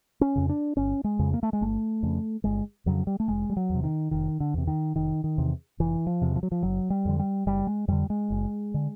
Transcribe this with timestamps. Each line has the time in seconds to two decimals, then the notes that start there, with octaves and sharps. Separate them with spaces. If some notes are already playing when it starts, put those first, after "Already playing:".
0.21 C#4
0.36 F2 C#3
0.49 D4
0.77 G1 C#4
1.04 G#3
1.19 F2 C#3
1.33 A#3
1.43 A3
1.53 G#3
1.61 G1 A3
2.03 F2 C#3
2.44 G1 G#3
2.86 F2 C#3 F#3
3.07 G3
3.20 A3
3.28 F1 G#3
3.50 G3
3.57 F#3
3.70 E2
3.75 C3
3.84 D#3
4.11 F1 D#3
4.40 D3
4.54 E2 C3
4.67 D#3
4.96 F1 D#3
5.24 D#3
5.38 E2 C3
5.80 F1 E3
6.07 F3
6.22 E2 C3
6.36 F3
6.43 F#3
6.52 F3
6.63 F#1 F#3
6.90 G3
7.05 F2 D3
7.19 G3
7.46 F#1 G3
7.67 G#3
7.88 F2 D3 G3
8.10 G#3
8.30 F#1
8.74 D3